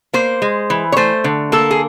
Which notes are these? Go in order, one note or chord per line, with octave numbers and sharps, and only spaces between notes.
A#3 C5
G#3
E3
C#5
A3 C5
D3
A#3 A4
G#4